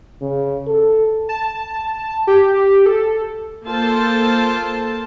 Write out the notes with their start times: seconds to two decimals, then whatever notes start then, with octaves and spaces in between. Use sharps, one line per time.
0.22 C#3
0.67 A4
1.29 A5
2.27 G4
2.86 A4
3.67 A#3 F4 A4 C5 A5